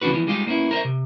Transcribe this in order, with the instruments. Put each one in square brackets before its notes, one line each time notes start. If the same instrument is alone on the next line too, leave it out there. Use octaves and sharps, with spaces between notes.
[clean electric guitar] C#2 E3 C#4 D4 F#4 B4
E3 F3 B3
G3 G#3 D#4 F4 G4
A#3 B3 C#4 E4
A#4 C5 D#5 E5
C3